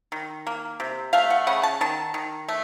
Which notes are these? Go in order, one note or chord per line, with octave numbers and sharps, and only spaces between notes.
D#3
A#3
C3
A3 F5
F#5
C#3 F#5
A5
D#3 A5
D#3
A3